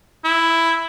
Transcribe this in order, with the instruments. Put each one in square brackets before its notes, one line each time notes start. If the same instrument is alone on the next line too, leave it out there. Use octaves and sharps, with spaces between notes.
[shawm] E4